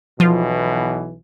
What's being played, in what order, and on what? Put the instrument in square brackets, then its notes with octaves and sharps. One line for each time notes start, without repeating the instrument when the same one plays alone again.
[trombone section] B1 B2 E3 [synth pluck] F3 F4